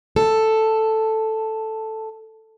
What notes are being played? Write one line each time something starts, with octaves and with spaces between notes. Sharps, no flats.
A4